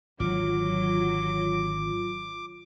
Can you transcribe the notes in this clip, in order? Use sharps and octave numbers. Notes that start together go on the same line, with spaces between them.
G#1 D3 F#3 F4 D6